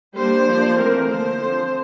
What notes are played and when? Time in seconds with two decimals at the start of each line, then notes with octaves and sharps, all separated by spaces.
0.15 G3 A#3 D4 C5
0.45 F3 A#3 D4
0.76 E3 A3 C4 A#4
1.07 D3 F3 A#3 C5
1.39 F3 C4